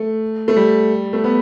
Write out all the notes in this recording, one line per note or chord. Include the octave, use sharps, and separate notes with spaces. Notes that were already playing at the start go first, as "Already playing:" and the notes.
Already playing: A3
A3
G3
A3
B3